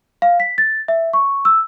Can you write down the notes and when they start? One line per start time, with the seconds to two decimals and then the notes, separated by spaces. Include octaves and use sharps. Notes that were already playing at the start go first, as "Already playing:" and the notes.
0.22 F5
0.40 B6
0.58 A6
0.88 E5
1.13 C#6
1.45 E6